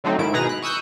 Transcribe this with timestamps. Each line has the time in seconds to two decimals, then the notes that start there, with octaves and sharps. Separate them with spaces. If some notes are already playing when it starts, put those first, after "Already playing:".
0.04 D3 F#3 A3 C4 D#4
0.18 G#2 D#3 E4 D7
0.33 B2 D#4 G#4 B4 A#5 A#6
0.49 B5 F#6
0.62 C#6 D#6 E6 F#6 G6